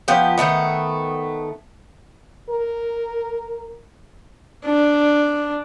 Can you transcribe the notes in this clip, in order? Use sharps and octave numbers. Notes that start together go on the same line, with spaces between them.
F3 B3 G4
D#3 G#3 A3 B3
A#4
D4